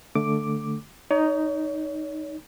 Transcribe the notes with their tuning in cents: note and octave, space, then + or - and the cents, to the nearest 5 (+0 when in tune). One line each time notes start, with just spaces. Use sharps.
D3 +0 A3 +0 D6 +0
D#4 +0 C#5 +35